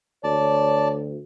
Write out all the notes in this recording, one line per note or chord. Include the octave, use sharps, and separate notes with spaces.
D2 C#5 D5 A5